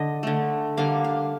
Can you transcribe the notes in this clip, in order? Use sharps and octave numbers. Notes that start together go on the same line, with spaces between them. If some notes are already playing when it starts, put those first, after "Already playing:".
Already playing: D3 D#5
D3 A3
D3 G3 A#3 F5
F5